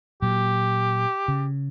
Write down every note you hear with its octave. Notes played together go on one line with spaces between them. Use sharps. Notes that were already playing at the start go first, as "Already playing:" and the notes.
A#2 F#3 G4
C#3